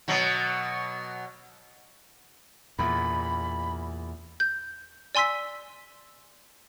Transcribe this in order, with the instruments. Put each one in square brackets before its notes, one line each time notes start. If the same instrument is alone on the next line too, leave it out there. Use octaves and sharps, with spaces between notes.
[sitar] B2 F#3
[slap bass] E2 A#2 [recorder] B5
[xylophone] G6
D5 G#5 C6 E6 B6